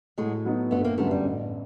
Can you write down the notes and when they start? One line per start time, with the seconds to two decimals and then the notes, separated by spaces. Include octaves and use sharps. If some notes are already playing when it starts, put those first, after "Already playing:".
0.18 A2 F#3 G#3
0.45 F#3 B3 D#4
0.71 G1 A3 B3
0.84 A#3 C4
0.98 F#2 D3 G3 A3 B3
1.11 G3
1.25 A1